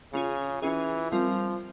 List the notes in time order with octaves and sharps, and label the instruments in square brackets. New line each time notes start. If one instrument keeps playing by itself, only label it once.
[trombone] C#3 [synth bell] C#4 F4 G#4
[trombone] E3 [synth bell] C#4 F4 G#4
[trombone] F3 [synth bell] G3 C4 F4 A#4